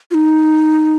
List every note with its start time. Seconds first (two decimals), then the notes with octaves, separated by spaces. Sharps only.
0.11 F4
0.14 D#4